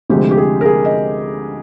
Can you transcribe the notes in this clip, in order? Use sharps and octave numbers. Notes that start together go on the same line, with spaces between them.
D2 C3 F3 G#3 G4
G4
G#4
A#4
G#4
D#5